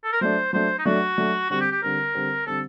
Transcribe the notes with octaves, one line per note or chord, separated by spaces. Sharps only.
A4
A#4
F#3 A3 D4 C5
F#3 A3 D4 C5
D#4
F#3 A3 D4 F#4
F#3 A3 D4
D3 G3 C4 F#4
G4
G4
D3 G3 C4 A#4
D3 G3 C4
D3 G3 C4 A4